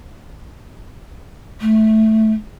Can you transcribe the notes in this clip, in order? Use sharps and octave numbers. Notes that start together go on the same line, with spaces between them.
A3